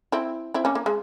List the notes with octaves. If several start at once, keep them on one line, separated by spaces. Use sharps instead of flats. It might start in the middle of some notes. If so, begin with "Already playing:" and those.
C4 E4
C4 E4
A#3 C#4
A#3
G#3